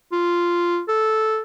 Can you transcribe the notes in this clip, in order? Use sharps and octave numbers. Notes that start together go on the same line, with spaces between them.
F4
A4